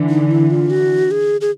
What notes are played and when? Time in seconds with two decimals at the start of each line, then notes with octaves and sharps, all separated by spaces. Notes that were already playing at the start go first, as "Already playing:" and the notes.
Already playing: D3 E3
0.10 D#4
0.31 E4
0.50 F4
0.70 F#4
1.11 G#4
1.41 G#4